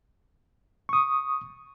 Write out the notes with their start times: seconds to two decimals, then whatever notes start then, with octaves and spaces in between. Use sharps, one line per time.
0.89 C#6 D#6